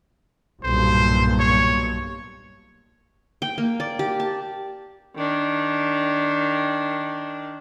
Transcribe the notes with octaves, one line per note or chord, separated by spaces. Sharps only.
B1 G2 A#2 C5
C#5
G5
A#3
D5
G4
A5
D#3 D4